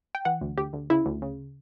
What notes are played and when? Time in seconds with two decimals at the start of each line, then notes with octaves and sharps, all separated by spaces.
0.15 G5
0.25 E3 F#5
0.41 D2
0.57 D2 G4
0.73 D2
0.90 C#3 E4
1.06 D2
1.22 C#3